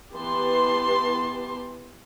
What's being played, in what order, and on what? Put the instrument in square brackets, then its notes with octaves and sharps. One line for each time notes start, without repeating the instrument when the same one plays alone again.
[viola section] E3 B3 G4 B4 A5 C6